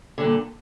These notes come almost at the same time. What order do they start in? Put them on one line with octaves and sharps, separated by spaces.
D3 G2 A#2